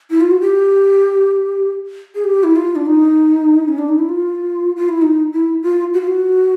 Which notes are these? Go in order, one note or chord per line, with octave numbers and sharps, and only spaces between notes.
E4
F4
F#4
G4
G#4
G4
E4
F4
D4
D#4
C#4
D4
D#4
E4
F4
F4
E4
D#4
E4
F4
F#4
F4
F#4